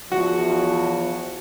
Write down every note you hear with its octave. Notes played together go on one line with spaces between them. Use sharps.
E2 F3 F#4